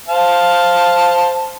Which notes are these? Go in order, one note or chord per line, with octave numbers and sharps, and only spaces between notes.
C5 F5 A5